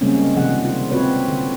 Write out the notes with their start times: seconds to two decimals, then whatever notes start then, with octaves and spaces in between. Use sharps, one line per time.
0.01 C#3 G3 G#3 A#3 C4 C#4
0.36 C3 D#3 F3 G#4 F#5
0.65 F4
0.91 C4 F4 F#4 B4 C#5
1.28 D3